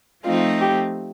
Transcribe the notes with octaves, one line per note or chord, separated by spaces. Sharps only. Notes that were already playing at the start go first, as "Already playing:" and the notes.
F3 A3 C4 D#4 F4
G4